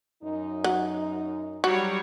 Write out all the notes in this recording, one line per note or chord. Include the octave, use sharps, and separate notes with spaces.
F#2 D#4
F#3 F#5
F#3 G3 F#4 C#5